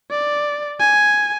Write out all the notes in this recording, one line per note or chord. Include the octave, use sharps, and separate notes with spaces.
D5
G#5